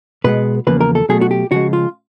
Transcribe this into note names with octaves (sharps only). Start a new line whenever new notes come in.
B2 G#3 B3 B4
E2 C#3 F3 A#3 B4
A#4
A4
B2 F#3 A3 G#4
F#4
G4
C#3 F3 G#3 F#4
F4